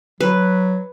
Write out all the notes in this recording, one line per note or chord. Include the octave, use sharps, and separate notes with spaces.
F#3 B4